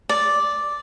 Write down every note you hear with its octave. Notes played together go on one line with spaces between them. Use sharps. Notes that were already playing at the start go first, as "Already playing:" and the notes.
D5